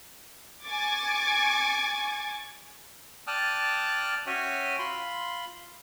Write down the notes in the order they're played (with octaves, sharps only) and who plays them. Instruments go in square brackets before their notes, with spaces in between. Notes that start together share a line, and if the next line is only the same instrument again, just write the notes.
[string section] G#5 C#6 D6 G#6 A6
[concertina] D5 G5 A5 D#6 F6 F#6
C#4 F#4 C#5 E5 G5 G#5
F4 B5 C6